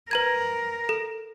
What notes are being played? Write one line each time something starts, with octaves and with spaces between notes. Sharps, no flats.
A#4 B4 A#5 G#6
A4